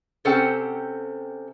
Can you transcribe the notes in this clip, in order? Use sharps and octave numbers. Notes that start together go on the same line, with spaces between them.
C3 C#4 A4 C5 F#5 G5